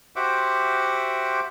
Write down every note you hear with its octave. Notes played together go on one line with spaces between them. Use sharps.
F#4 G4 C5 E5 F#5 D6